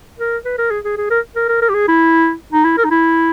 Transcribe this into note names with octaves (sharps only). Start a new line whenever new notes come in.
A#4
B4
A#4
G#4
G#4
G#4
A#4
A#4
A#4
A#4
G4
G#4
E4
D#4
E4
A#4
D#4
E4